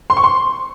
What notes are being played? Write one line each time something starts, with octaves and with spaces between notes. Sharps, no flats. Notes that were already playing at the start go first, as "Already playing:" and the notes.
C6
C#6
C6